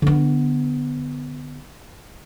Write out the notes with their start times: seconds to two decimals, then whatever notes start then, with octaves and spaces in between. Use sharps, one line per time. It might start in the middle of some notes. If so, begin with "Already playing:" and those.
0.02 D3 B3